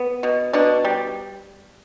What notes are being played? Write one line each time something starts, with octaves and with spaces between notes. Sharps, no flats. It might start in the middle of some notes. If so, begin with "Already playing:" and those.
Already playing: B3
B2
B2 D4
G3